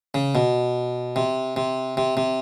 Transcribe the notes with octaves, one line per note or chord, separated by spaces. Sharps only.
C#3
B2
C3
C3
C3
C3